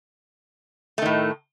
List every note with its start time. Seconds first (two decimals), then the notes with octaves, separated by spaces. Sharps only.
0.98 A3
1.02 D#3
1.06 A2